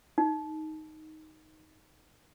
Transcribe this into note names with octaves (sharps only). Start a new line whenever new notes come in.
D#4